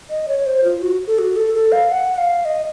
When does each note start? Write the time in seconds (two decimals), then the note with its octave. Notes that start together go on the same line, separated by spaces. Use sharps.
0.10 D#5
0.28 C#5
0.46 C5
0.64 F4
0.82 F#4
1.07 A4
1.19 F#4
1.36 A4
1.54 A4
1.72 F5
1.91 F#5
2.14 F#5
2.18 F5
2.45 D#5